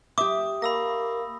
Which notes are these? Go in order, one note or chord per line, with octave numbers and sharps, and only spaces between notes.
G4 E5 D6 D#6
A#3 B5 E6 A#6